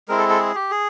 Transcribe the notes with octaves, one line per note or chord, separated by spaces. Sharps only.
G#3 C4 E4 A#4
A4
A4
G#4
G4
G#4